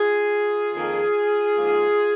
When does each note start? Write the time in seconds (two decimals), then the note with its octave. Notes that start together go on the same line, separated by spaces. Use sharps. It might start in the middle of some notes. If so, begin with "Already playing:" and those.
Already playing: F4 G#4
0.74 F2 D#3 A#3
1.56 G#2 F3 A#3